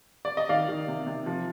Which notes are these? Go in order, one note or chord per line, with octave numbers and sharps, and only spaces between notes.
D5
D#5
D#3 D5 F5
D#3
C3
C3
F3